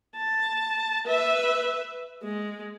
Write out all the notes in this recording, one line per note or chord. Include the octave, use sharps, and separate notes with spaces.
A5
B4 E5
G#3